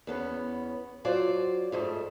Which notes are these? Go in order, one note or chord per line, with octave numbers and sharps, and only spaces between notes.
E2 B3 C#4
F#3 F4 C5 D5
F2 G#2 A3